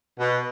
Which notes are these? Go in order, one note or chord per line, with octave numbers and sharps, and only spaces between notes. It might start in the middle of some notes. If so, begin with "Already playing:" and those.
B2